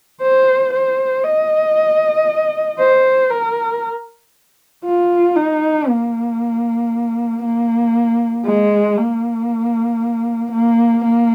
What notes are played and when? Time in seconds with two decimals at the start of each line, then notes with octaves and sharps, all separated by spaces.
0.21 C5
0.73 C5
1.24 D#5
2.79 C5
3.30 A#4
4.85 F4
5.36 D#4
5.88 A#3
7.43 A#3
8.46 G#3
8.98 A#3
10.51 A#3
11.04 A#3